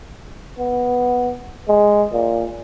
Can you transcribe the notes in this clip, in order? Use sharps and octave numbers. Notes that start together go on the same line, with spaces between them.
B3
G#3
A#2